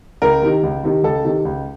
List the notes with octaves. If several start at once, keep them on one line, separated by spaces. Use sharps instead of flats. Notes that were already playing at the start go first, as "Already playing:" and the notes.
C#2 A#4
C3 D#3
C#2
C3 D#3
C#2 A4
C3 D#3
C#2